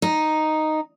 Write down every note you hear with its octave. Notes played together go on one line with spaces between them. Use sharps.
D#4